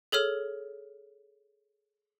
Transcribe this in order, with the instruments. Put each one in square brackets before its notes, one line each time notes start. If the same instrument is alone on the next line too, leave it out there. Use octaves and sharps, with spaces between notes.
[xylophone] G#4 A4 C#5 F6